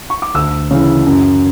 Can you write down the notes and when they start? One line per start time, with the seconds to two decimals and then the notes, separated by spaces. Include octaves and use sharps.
0.10 C#6
0.22 D6
0.34 D2 E6
0.71 C#3 E3
1.06 F#2